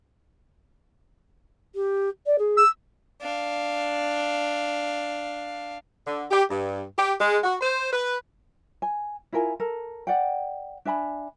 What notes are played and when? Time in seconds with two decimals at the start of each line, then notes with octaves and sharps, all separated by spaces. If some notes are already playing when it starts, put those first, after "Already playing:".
1.74 G4
2.26 D5
2.38 G#4
2.57 E6
3.22 D4 F5
6.07 D3
6.31 G4
6.50 G2
6.98 G4
7.19 G#3
7.44 F#4
7.61 C5
7.92 B4
8.82 G#5
9.33 E4 F4 A#4 G#5
9.60 A4 A#4
10.07 D5 F#5 G5
10.85 D4 E5 G#5 B5